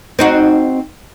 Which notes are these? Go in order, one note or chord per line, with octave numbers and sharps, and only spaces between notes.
C4 D#4 F#4